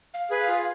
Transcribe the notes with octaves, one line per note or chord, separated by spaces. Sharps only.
F5
G#4 B4
F5
F4